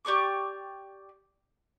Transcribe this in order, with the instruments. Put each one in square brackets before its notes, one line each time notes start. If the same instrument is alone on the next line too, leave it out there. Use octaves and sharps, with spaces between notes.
[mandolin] G4 D5 C#6 D6